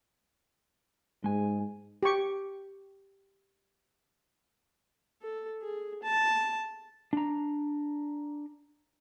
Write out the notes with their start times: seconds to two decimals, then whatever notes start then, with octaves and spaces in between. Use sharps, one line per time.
1.24 G#2 G#3 G#5
2.03 G4 C#6
5.22 A4
5.62 G#4
6.03 A5
7.13 D4 A#5